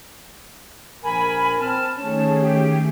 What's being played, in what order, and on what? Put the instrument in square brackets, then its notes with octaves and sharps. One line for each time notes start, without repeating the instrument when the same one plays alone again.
[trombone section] A#1 F3 A#4 [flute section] G#5 B5
[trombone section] C4 [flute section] A5 F6
[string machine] D#3 A3 G#4 [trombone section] C#4 [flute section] A5
[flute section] G4